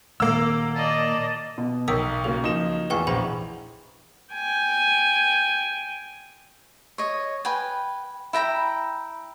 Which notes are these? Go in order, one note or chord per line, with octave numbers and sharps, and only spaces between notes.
A#2 D#3 A#3 F#5 E6
D5 D#5 A5
B2
B1 A#4 G5 D#6 E6 B6
C#3 F#3 A#3 A4
F3 D#4 E7
A1 E2 G#4 B4 G5 C#6
A#1 C5 F#5 G5 B5 F#7
G5 G#5
C#5 D#5
B4 G5 G#5
E4 G5 A#5 B5